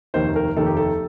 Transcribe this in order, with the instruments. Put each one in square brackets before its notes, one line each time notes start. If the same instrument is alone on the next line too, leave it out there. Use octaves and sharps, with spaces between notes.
[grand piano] F1 D#2 D#3 A#3 D#4 C5
A#4
F1 D#2 D#3 A#3 D#4 A4
G4
A4